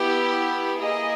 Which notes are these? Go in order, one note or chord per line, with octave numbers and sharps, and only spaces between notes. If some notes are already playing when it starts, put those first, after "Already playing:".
Already playing: B3 E4 G4
A#3 E4 G#4 D#5